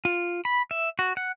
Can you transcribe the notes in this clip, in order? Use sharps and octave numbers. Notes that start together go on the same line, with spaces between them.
F4
B5
E5
F#4
F#5